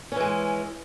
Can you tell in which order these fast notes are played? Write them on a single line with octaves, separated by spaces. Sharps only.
C#4 E3 G#3